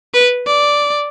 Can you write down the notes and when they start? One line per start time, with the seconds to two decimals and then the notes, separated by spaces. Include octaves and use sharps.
0.14 B4
0.46 D5